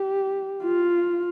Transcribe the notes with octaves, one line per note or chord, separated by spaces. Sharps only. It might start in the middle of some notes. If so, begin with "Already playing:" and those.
Already playing: G4
F4